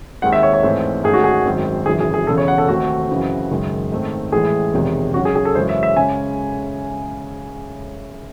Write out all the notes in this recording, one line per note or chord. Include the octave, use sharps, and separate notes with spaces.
D#2 D#3 G#3 C4 F#5
E5
C#5
C#5
A1 G#2 E3 A3 C4
G#2 D#3 A3 C#4 G#4
F#4
G#4
G#1 F#2 D#3 G#3 C4
G#1 F#2 C#3 E3 G#4
G#4
G#4
E1 E2 C#3 A4
C#5
F#5
A4
D#2 D#3 A3 C4 F#4
F#2 C#3 E3 C4
F#1 F#2 D#3 G#3
G#2 D#3 A3 C4
A1 A2 E3 G#3 G#4
E1 E2 C3 D#3 G#3
F#2 C#3 F#3 C#4 F#4
G#4
G#4
A4
F#2 C#3 E3 G#3 C#4 C5
E5
E5
C#3 G#3 C#4 G#5